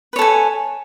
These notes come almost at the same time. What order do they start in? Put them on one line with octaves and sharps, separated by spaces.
B4 C#5 A4 G#5